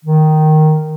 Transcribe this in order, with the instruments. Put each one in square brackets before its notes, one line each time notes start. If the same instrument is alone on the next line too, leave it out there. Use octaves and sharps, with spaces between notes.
[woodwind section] D#3